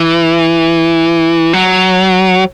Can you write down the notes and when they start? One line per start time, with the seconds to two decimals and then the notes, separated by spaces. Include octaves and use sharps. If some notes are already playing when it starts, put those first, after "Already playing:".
Already playing: E3
1.53 F#3